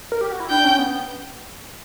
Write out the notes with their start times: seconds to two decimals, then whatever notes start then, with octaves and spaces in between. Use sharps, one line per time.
0.12 A#4
0.21 G4
0.32 F#4
0.40 E4
0.49 D4 G5
0.64 C#4
0.78 B3